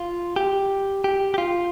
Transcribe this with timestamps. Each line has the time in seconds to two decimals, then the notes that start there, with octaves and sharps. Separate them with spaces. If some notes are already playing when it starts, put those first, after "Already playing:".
Already playing: F4
0.36 G4
1.04 G4
1.34 G4
1.38 F4